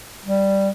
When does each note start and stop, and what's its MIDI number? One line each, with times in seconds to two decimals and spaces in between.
0.25 0.69 55